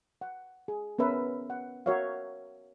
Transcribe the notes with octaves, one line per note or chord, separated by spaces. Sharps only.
F#5
G#4
B3 C#4 A#4 B4 E5
F#5
F#4 A#4 C#5 E5 F5